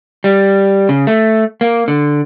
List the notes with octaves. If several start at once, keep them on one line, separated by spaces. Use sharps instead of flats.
G3
C#3
A3
A#3
D3